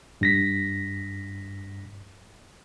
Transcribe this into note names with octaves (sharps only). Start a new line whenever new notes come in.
G2 A#6 B6